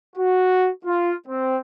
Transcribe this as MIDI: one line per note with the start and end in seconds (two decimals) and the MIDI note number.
0.16 0.68 66
0.85 1.12 65
1.26 1.57 60